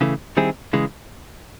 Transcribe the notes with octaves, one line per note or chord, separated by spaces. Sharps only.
C#3 E3 A3
D#3 G3 C4 E4 G#4
C#3 E3 G#3